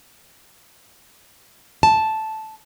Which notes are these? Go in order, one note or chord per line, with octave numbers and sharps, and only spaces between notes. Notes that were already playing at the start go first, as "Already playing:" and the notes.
A5